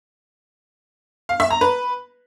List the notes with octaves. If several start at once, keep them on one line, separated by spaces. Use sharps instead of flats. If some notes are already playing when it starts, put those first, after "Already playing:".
F5
E5
A#5
B4